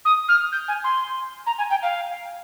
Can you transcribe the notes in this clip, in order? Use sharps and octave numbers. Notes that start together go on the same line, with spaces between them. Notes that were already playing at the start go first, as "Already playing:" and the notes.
D#6
F6
G6
G#5
C6
A#5
G#5
G5
F5